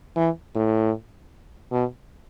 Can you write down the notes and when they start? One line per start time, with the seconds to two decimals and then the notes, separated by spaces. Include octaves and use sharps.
0.17 E3
0.56 A2
1.72 B2